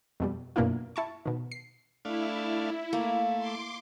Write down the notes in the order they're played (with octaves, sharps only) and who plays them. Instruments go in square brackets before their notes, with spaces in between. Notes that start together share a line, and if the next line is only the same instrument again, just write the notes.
[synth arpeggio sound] F2 B2 G3
F#2 B2 A#3 D4 E4 F4
E4 A5 C#6
B2 D#3
C7
[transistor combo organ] A3 D4 F5 [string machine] E4
[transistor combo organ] A3 [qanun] A#3
[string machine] C6 D6